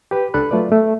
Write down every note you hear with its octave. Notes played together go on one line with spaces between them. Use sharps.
G4 B4
C#2 D4 A4 B5 F#6
F#3 A3 F4 B4 D5
A3